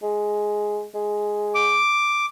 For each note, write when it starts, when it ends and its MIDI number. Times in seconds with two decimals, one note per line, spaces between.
0.03 0.83 56
0.94 1.77 56
1.55 2.26 86